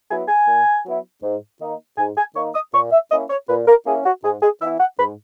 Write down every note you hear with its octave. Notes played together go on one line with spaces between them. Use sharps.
F#3 B3 E4 G#5
G#5
A#2
F#3 B3 E4
G#2
D#3 A#3 D#4
G#2 G#5
G#5
D#3 A#3 D#4 C#6
D#6
A#2 C#6
E5
A#3 C#4 E4 D#5
C#5
A#2 B4
A#4
A#3 C#4 E4 G#4
F#4
G#2 G#4
G#4
E3 B3 E4 E5
F#5
G#2 B5